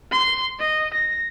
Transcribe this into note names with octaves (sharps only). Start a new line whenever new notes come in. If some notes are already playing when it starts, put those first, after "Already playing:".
C6
D#5
A#6